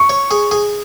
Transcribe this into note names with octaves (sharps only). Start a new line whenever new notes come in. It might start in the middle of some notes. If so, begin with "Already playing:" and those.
Already playing: C#6
C#5
G#4
G#4